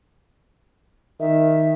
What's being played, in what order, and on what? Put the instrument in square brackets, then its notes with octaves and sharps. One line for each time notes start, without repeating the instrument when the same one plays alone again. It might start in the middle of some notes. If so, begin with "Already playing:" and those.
[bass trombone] D#3 [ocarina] E5